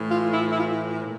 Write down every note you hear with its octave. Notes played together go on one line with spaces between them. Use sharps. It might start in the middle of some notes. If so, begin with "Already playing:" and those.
Already playing: A2 E3
F4
E4
E4
F4
A#2